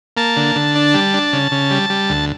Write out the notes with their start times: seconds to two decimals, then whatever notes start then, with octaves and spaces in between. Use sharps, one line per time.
0.17 A#3 A5
0.36 D3
0.56 D3
0.75 D4
0.94 G3
1.14 D4
1.33 C#3
1.52 C#3
1.71 G3
1.90 G3
2.09 D2